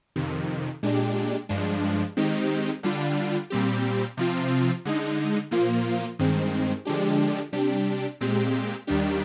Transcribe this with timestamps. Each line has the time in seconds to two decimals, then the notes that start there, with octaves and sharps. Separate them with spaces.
0.16 F2 C3 D#3
0.83 A#2 G#3 D4 G4
1.49 G2 F3 G#3 D4
2.17 D#3 G#3 C4 D#4 G4
2.83 D3 G3 D4 F4
3.50 A#2 G3 C4 G4
4.17 C3 F3 C4 F4
4.85 D3 G#3 D#4
5.51 A#2 F3 A#3 F4
6.19 G2 D#3 G#3 C4
6.85 D3 F3 G#3 D4 G4
7.53 C3 G3 D4 G4
8.21 A#2 G#3 C4 G4
8.87 D#2 D#3 G3 D4 G4